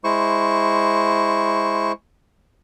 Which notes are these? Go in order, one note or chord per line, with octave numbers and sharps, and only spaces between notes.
G#3 E4 C5 C#6